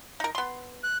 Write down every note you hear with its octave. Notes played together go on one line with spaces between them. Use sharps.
D#4 A#4
B3 C6
F#6